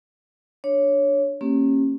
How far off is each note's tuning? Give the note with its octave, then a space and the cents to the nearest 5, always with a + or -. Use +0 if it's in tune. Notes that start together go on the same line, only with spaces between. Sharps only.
D4 +0 C#5 +0
A#3 -20 C#4 -30 G4 -10